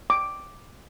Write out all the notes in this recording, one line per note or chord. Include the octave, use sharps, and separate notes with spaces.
D6